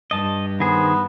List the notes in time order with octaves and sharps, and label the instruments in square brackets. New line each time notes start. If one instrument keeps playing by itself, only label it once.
[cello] G2 [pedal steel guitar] D#5 A5
[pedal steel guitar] D#3 G#4 C5 [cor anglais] B3